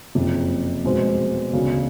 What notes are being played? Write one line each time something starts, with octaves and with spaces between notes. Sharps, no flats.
F#1 F2 C3
F1 E2 B2 G#3 C4
E1 D2 C#3